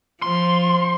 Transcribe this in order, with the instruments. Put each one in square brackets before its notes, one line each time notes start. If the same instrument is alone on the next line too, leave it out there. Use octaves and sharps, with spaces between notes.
[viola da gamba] F3 [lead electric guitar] C6